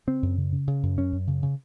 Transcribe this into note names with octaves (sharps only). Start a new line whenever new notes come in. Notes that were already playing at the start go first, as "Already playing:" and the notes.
C#3 C4
F#2
C#3
C#3
C#3
F#2
F#2 C#4
F#2
C#3
C#3